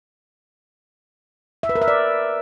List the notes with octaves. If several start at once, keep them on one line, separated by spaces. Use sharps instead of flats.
E5
B4
A#4
E5
D5